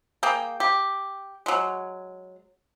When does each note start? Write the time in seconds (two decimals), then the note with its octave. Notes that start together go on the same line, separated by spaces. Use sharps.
0.23 A#3 G#4 G5
0.60 G4
1.46 F#3 G#3